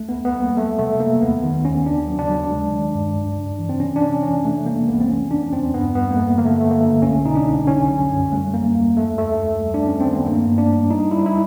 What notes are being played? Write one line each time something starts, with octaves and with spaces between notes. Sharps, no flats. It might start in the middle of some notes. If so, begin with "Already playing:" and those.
Already playing: D2 A3
B3
D2
B3
G3
A#3
F#3 A3
C3 A3
F#3 A#3
D#2 B3
D#3
D#2 C#4
C#3 D4
F#3
D4
F#3
G#3
D#3
G2
C#2
C#3
E3
C4
C3 C#4
D4
C3 C#4
E3 C#4
C3 A3
G#3 A#3
C2 B3
C4
E3 C#4
C#3 D4
E2 C4
G2 B3
G3 B3
A#3
G2 A3
D3 A#3
A3
D3 A3
A#3
D3
C2 C#4
B2 D#4
D4
C2
D3 C#4
F#3
F#2
G3 A3
G3 A#3
D#2 A#3
F#2 A3
F#2 A3
F#2
G3
D4
D#2 C#4
D#3 C4
B3
G2 A#3
G2
D4
G3
G3 D#4
G3 E4
D#4
E4